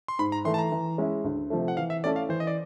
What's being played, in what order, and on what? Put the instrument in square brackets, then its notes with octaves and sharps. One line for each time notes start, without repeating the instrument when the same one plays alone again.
[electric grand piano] C6
[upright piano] G#2 [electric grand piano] B5
[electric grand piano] A#5
[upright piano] E3 A3 [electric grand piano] C6
[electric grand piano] A5
A#5
[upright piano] E3
G#3 C#4 E4
D2
C3 F3 A3
[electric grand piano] F#5
[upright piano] E3 [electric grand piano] F5
[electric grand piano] E5
[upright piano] A3 C#4 E4 A4 [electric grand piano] D5
[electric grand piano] F5
[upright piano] E3 [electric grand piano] C5
[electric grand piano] D#5
D5